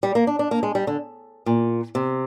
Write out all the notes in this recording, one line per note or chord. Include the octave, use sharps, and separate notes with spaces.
G3
A#3
D4
D4
A#3
G#3
G3
D3
A#2
C3